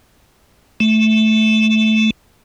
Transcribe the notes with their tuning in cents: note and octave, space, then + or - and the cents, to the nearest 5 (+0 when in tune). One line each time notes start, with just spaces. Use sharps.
A3 -10